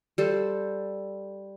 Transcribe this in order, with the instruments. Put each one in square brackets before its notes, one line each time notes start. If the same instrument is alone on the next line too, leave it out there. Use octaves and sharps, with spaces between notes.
[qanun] G3 A4 C5